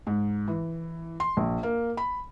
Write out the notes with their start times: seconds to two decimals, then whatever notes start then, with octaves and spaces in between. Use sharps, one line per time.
0.07 G#2
0.48 E3
1.20 C6
1.37 A#1
1.63 A#3
1.97 B5